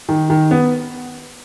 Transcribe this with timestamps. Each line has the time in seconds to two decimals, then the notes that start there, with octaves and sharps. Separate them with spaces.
0.09 D#3
0.30 D#3
0.51 B3